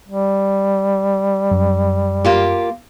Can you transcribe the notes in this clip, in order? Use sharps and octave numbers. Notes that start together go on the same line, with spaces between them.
G3
F#2
A#3 F4 G4